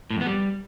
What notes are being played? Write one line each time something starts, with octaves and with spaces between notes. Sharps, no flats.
A2
F2
B3
G3